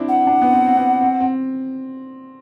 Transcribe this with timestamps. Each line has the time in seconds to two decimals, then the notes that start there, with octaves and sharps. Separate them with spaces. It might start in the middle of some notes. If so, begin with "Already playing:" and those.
Already playing: C4 D4 E4
0.08 F#5
0.27 D4
0.42 B3
0.52 C4
0.66 C4
0.77 B3
1.01 C4
1.20 C4